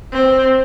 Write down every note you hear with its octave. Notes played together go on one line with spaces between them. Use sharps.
C4